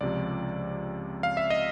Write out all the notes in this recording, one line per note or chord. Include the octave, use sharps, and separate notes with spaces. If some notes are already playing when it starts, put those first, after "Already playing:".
C#2 C3 F3 D5
F5
E5
D#5